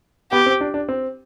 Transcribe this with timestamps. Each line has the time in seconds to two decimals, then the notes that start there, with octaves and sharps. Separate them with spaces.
0.32 B3 G4
0.46 C4
0.61 D4
0.74 D4
0.89 C4